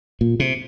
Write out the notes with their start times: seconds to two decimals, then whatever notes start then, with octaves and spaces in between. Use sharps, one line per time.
0.21 A#2
0.40 C3